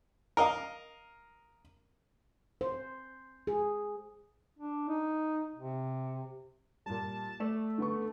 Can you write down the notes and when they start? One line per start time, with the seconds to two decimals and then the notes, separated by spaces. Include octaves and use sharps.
0.37 A#4 D#5 F5
2.61 C5
3.47 G#4
4.59 D4
4.89 D#4
5.56 C3
6.86 A#2 G3 A5
7.40 A3 D5 E7
7.78 D3 B3 C#6